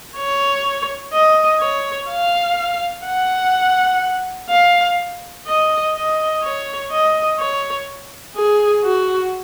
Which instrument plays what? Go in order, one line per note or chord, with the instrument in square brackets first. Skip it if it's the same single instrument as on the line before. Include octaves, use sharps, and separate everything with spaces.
[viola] C#5
D#5
C#5
F5
F#5
F5
D#5
D#5
C#5
D#5
C#5
G#4
F#4